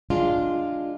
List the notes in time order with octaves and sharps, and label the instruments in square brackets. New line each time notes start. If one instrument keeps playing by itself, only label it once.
[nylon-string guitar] G#3 D4 F4